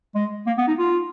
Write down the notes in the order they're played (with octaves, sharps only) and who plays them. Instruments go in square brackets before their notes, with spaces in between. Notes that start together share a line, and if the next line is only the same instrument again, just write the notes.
[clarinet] G#3
A#3
B3
D#4
F4